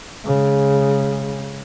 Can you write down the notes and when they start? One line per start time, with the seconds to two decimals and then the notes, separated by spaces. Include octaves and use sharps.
0.25 C#3 G#3